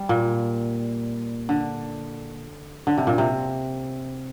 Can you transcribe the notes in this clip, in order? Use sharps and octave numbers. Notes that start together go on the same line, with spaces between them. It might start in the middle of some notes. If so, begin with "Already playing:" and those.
Already playing: G3
A#2
D3
D3
C3
A#2
C3